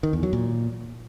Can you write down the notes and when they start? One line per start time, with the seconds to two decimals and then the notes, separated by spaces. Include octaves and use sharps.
0.03 D#3
0.13 E2
0.23 F#3
0.33 A#2